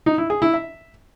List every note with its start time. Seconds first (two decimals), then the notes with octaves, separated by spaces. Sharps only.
0.06 D#4
0.18 E4
0.30 G#4
0.42 E4
0.54 E5